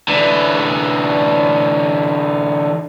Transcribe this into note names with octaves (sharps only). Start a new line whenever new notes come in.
D3 E3